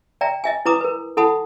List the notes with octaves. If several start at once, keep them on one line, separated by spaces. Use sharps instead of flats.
D5 E5 G5 A#5
D#5 E5 G#5
E4 B4 A#5 D6 D#6
A#4 B4
E4 A4 F#5 A5 B5 D#6